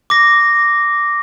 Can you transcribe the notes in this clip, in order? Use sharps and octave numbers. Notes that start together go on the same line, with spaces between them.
D6 A#6